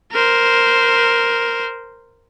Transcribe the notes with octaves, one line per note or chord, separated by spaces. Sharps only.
A#4 C5